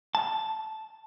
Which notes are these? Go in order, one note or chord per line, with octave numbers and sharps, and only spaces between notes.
A5